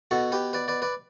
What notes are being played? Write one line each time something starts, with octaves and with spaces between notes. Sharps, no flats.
B2 F#4 A4
G4 B4
B4 D5
B4 D5
B4 D5